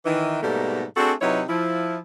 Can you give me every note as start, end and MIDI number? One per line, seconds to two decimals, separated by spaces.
0.05 0.39 51
0.05 0.39 52
0.05 0.39 63
0.42 0.84 44
0.42 0.84 47
0.42 0.84 55
0.42 0.84 57
0.42 0.84 58
0.42 0.84 69
0.97 1.13 57
0.97 1.13 60
0.97 1.13 62
0.97 1.13 66
0.97 1.13 68
0.97 1.13 69
1.22 1.42 48
1.22 1.42 54
1.22 1.42 63
1.22 1.42 64
1.22 1.42 71
1.22 1.42 73
1.49 1.98 53
1.49 1.98 64